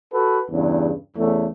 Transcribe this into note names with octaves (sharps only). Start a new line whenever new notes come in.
F#4 A4 B4
E2 G2 C#3
E2 C#3 A3